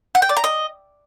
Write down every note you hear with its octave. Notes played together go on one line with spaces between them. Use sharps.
F#5
G5
D5
A#5
D#5